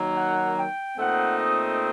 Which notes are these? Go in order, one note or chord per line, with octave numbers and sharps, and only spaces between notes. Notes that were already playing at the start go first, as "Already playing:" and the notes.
Already playing: D#3 F#3 A#3
F#5
G5
A#2 A3 C4 D#4 F#5
D#5